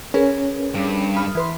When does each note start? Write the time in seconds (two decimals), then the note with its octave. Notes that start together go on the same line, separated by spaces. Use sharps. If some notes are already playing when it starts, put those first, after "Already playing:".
0.14 C#4 G#4 A#4 B4
0.75 G2
1.16 B5 D#6 F6
1.35 E3 B4 C6